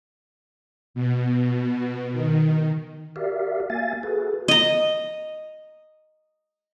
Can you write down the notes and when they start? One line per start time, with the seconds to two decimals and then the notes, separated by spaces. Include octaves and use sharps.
0.94 B2
2.11 D#3
3.16 F#4 G4 A#4 D5 E5 F5
3.70 A#3 E5 F5 G#5 A6
4.03 F#4 G#4 A4 B4
4.48 D#5 A#5